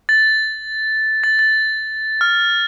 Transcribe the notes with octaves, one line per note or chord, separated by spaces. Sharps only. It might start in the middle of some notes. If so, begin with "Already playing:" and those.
A6
A6
A6
F6